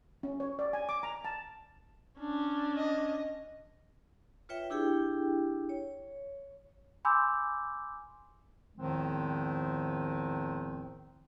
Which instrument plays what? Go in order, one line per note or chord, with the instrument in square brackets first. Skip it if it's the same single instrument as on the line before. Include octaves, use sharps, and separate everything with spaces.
[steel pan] C#4
C#5
D5
G#5
D6
A#5
A5
[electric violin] C#4 D4
[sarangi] D#5
[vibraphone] F4 B4 C#5 E5 G5
D4 E4 G4 G#4 G5
C#5
[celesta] G#5 B5 C6 D6 E6 G6
[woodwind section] E2 A2 D#3 F3 G#3 C4